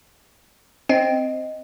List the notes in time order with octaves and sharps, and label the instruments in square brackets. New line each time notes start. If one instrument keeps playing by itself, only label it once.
[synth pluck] C4 [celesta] D#5